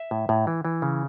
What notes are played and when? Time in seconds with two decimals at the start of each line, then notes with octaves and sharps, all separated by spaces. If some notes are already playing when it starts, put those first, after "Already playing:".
Already playing: E5
0.11 A2
0.29 A2
0.47 E3
0.65 E3
0.82 C#3